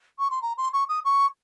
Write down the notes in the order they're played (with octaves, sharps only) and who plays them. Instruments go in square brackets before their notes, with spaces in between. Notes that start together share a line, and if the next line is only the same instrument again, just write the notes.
[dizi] C#6
C6
A#5
C6
C#6
D#6
C#6